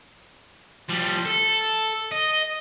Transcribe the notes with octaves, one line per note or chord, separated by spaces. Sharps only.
F3 G3
A4
D#5